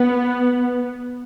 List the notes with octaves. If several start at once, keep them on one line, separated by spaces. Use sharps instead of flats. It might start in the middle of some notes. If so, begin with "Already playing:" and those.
Already playing: B3